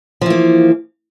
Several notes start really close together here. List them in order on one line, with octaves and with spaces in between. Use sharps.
F3 E3 A#3